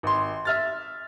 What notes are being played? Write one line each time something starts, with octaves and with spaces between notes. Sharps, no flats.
G#1 C6
E5 F6 A6